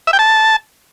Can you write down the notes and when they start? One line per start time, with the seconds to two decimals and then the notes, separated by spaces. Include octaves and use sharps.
0.07 E5
0.13 G5
0.19 A5